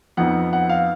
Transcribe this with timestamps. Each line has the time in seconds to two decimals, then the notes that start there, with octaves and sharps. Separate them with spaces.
0.17 F2 F3 B3 D#4 F#5
0.53 F#5
0.69 F5